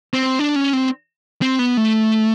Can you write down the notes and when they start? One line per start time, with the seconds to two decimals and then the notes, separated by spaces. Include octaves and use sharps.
0.14 C4
0.39 D4
0.56 C#4
0.73 C4
1.42 C4
1.59 B3
1.77 A3